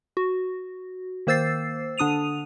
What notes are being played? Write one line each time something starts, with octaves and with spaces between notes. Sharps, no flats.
F#4
D#3 A#3 C5 E6 A6 C7
D3 D4 D#6 D#7 F7